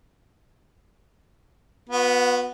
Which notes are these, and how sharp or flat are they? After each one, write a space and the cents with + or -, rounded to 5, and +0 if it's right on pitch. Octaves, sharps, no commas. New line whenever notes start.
B3 +0 F#4 -40